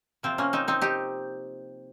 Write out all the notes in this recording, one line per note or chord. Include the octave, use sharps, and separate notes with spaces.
C3 F3 A#3 C4
A#3 C#4
C4 D#4
C4 D#4
D#4 G4